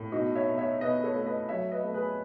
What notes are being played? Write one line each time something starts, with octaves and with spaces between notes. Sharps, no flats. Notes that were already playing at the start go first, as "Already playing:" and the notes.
Already playing: A2
B2 D#4 F#4
C#5 E5
B2
C#5 E5
B2 B4 D#5
A4 C#5
A3
B4 D#5
F#3 C#5 E5
B4 D#5
A3
G#4 B4